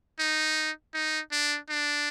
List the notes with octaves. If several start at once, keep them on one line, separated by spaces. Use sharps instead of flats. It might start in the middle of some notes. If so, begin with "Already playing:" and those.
D#4
D#4
D4
D4